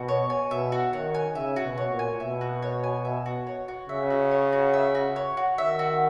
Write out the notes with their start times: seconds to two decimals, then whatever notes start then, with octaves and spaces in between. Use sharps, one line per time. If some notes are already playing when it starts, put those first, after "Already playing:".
Already playing: B2 F#4
0.08 C#5
0.30 G#5
0.50 B2 E5
0.72 F#4
0.93 D#3 C#5
1.15 G#5
1.35 C#3 E5
1.56 F#4
1.63 B2
1.78 C#5
1.91 A#2
1.99 G#5
2.20 B2 E5
2.41 F#4
2.63 C#5
2.84 G#5
3.05 E5
3.26 F#4
3.47 C#5
3.68 F#4
3.89 C#3 E5
4.10 F#4
4.31 C#5
4.53 F#4
4.74 E5
4.95 F#4
5.16 C#5
5.37 F#4
5.58 D#3 E5
5.79 F#4